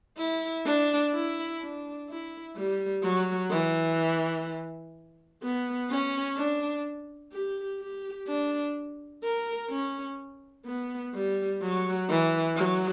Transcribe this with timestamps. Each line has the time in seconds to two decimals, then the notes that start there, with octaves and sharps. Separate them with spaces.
0.17 E4
0.65 D4
1.13 E4
1.61 D4
2.09 E4
2.57 G3
3.03 F#3
3.51 E3
5.42 B3
5.90 C#4
6.36 D4
7.32 G4
7.80 G4
8.27 D4
9.23 A#4
9.70 C#4
10.65 B3
11.14 G3
11.62 F#3
12.09 E3
12.56 F#3